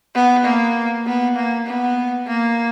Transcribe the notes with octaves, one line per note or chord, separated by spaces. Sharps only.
B3
A#3
B3
A#3
B3
A#3